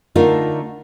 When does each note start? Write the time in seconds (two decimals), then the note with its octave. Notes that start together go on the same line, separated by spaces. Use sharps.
0.15 D3 A3 D4 D#4 F4 A#4